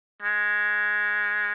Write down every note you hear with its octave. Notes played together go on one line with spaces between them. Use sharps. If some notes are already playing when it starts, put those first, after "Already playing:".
G#3